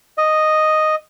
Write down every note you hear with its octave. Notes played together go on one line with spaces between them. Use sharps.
D#5